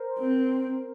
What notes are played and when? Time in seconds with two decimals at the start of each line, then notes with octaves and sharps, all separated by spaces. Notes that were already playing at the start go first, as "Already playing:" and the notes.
Already playing: A#4 C5
0.19 C4